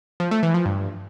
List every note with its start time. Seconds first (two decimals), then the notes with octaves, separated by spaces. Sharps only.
0.20 F3
0.31 A3
0.43 E3
0.54 F3
0.66 G2